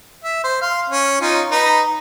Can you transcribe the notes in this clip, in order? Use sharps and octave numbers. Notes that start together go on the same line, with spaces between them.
E5
C5
F5 C6
C#4
C#4 D#4 F4
D#4 B4 A#5